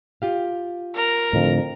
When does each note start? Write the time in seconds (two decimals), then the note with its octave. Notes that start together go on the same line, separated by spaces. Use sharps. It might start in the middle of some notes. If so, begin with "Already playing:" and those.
0.22 F4 G4 F5
0.95 A#4
1.33 F2 A2 D3